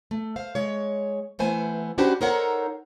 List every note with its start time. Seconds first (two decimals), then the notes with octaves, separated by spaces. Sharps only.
0.11 A3
0.36 C5 F5
0.55 G#3 C#5
1.39 E3 A3 B3 C5 G#5
1.98 C#4 D4 F#4 G4 B4 C5
2.21 D#4 A4 A#4 C5 C#5 F#5